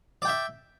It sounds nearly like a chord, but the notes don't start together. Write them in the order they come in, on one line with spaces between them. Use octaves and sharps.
D5 G5 E5